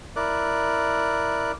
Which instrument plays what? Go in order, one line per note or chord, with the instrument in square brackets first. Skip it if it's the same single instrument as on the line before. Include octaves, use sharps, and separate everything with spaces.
[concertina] E4 A#4 D5 F#6